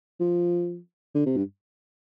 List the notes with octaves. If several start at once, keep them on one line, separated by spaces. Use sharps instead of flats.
F3
D3
C3
G2